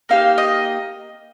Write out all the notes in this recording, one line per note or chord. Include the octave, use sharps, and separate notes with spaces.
A#3 D#4 G4 F5
D#5